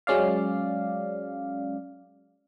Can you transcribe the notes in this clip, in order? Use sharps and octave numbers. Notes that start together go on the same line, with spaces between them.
F#3 G#3 C#4 D5 F5